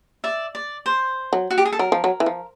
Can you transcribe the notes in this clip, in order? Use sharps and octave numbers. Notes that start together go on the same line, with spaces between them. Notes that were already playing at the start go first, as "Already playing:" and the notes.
D5 E5
D5
C5
F#3
F#4
G4
G#4
A4
F#3 A#4
F3
F#3
E3
F3